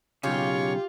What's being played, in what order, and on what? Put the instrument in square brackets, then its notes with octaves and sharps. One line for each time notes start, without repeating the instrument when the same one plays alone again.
[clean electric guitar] B1 C#3 [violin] F4 [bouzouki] G4 [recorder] C#5